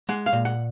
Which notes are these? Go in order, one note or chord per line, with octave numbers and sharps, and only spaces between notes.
G#3 F#5
F5
A#2
F#5